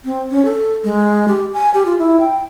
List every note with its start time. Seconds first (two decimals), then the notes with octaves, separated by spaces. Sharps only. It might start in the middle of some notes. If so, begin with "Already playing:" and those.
0.05 C4
0.31 C#4
0.45 A4
0.84 G#3
1.28 G4
1.54 G#5
1.74 G4
1.86 F4
1.99 E4
2.20 G5